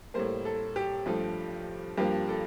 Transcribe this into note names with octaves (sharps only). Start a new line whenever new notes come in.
A2 G3 A#3 C5
A4
G4
G2 F3 A3
G2 F3 A#3 G4
A4